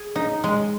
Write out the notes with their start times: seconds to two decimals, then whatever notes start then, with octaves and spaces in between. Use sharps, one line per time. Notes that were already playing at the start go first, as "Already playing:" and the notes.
Already playing: G#4
0.16 D#4
0.44 G#3